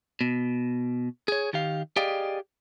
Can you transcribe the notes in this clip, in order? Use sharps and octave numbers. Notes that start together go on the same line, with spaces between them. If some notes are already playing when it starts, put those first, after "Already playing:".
B2
G#4 C#5
D#3 G4 F5
G4 G#4 D5 D#5 F5 G5